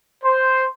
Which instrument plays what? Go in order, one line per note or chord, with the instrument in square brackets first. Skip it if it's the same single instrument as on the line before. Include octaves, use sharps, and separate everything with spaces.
[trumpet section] C5